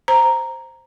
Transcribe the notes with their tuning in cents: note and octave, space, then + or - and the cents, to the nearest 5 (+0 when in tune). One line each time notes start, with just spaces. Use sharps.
C5 +0 A#5 +0